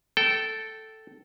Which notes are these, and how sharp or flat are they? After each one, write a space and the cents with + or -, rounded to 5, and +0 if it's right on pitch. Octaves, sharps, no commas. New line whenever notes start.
A4 +0 G5 -25